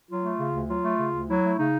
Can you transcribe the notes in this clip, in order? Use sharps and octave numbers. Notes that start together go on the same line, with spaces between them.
F#3 F4
A3
C#3
D2
F#3 F4
A3
C#3
D2
F#3 E4
A3
C#3 D#4